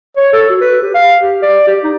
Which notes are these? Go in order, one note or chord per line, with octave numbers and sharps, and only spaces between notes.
C#5
A4
F#4
B4
G4
F5
G4
D5
G4
D#4